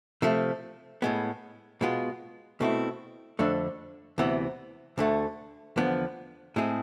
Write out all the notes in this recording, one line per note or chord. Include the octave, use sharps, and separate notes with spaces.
C3 F3 A3
A2 G#3 B3
B2 G#3 B3 F4
B2 A3 C4 E4
F2 D3 A3 D4
D2 C3 E3 B3
D2 D3 A3
E2 D3 F3 B3
A2 G#3 C4 G#4